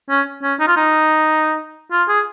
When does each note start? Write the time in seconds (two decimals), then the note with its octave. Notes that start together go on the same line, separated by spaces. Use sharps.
0.10 C#4
0.43 C#4
0.60 D#4
0.68 F4
0.76 D#4
1.92 F4
2.08 G#4